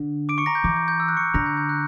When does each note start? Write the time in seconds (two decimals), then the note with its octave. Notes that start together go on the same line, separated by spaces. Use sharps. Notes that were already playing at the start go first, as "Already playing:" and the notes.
Already playing: D3
0.29 D6 D7
0.38 C#6 C#7
0.46 A#5 A#6
0.55 G6
0.64 E3 D6
0.76 G6
0.88 G6
1.00 E6
1.08 F#6
1.17 C#6 C#7
1.34 D3 A#5 A#6
1.46 G6
1.57 G6
1.69 F#6